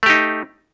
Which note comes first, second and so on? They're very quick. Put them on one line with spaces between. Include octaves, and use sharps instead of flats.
A3 G4 D#4